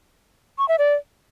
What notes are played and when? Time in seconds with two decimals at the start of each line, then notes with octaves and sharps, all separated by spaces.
0.58 C#6
0.68 E5
0.79 D5